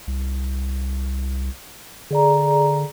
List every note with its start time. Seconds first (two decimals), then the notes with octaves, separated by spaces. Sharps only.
0.07 C2
2.11 D3 G#4 D5 A#5